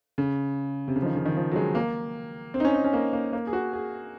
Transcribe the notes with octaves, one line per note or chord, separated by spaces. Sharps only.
C#3
C3
C#3
F3
D#3
C#3
D#3
F3
F#3
G#3
A#3
C4
D#4
C#4
D#4
C#4
A#3
A#3
A#3
G#4
F#4
G#4